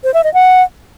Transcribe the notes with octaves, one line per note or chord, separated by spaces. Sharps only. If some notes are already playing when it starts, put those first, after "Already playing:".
C5
E5
D#5
F#5